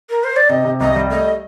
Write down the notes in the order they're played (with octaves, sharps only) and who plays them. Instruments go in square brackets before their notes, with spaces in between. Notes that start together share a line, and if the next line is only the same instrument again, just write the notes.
[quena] A#4
C5
D5
[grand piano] C3 [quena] D#5
[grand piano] C3
[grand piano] C2 [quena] D#5
[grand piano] G3
[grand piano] A3 [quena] D#5